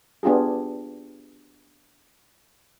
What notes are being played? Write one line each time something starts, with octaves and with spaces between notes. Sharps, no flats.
B3 D4 F4 G4 G#4